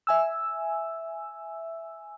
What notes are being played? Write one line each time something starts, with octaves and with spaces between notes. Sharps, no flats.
E5 G#5 E6